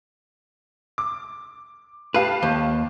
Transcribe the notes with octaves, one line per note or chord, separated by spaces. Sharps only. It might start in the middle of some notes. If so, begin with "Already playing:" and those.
D6
G4 B4 F5 A5
D#2